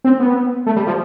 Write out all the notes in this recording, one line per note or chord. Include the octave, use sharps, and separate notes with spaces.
C4
B3
A3
G3
F3